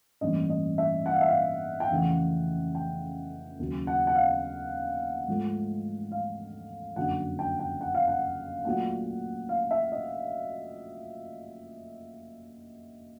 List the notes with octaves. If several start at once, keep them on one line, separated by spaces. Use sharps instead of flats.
A1 G2 E3 G3 A#3 D#5
D#5
E5
F#5
F5
E5
F5
G5
F2 C#3 E3 A3 C4 F#5
G5
D#2 C#3 F#3
F#5
F#5
F5
G#2 F3 A3
F5
F#1 F2 D3 F#3 A#3 F#5
G5
G5
F#5
F5
F#5
A#2 F#3 A3 F#5
F5
E5
D#5